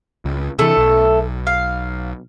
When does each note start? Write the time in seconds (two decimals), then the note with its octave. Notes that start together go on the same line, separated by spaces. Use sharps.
0.25 C#2
0.59 C3 E3 A3 A4
0.77 B1
1.47 F5